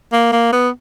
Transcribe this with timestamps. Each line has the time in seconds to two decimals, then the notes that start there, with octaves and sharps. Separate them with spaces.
0.13 A#3
0.32 A#3
0.53 B3